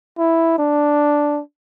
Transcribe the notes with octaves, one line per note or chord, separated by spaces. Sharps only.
E4
D4